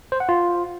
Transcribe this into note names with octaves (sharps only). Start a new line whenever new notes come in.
C5
F#5
F4